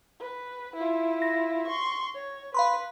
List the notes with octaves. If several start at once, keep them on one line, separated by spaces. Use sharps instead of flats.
B4
E4 F4
A#6
C6 C#6
C#5
B4 F5 B5 C6